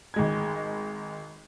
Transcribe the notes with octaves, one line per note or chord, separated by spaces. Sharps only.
G#1 G#3 G#6